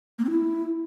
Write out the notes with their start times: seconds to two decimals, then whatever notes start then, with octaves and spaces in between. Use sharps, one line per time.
0.19 A#3
0.25 C4
0.30 E4